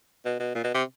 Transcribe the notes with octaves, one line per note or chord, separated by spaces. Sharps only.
B2
B2
A#2
B2
C3